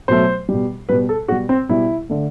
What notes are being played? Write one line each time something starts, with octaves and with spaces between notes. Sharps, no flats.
B2 F#3 A3 C5
B2 G3
B2 G3 B4
A4
B2 G3 F#4
C4
B2 G3 E4
D3 A3